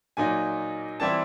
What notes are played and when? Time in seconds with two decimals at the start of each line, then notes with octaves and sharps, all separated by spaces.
0.17 A#2 F#3 A#3 D#4 G#5
1.00 E3 G3 C4 E4 A5